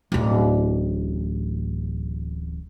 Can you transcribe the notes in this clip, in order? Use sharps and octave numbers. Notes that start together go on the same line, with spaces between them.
D1 A1